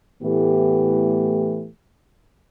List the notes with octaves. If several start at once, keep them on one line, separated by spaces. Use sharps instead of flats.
A2 E3 A3 B3 G4